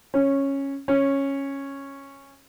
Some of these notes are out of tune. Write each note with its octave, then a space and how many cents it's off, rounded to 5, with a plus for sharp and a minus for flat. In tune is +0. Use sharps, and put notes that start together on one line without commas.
C#4 -10
C#4 -10